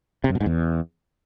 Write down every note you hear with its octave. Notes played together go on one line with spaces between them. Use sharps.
C3
F#2
B2
G#2
E2